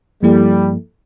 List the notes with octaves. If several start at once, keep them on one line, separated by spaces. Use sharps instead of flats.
G2 F3 G3 A#3 E4 A4